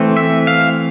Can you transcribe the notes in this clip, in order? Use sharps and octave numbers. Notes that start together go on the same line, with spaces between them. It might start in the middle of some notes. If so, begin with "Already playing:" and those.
Already playing: E3 A3 C4
E5
F5